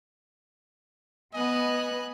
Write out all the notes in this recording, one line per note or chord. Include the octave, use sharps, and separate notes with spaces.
B3 D#5 G#5 F#6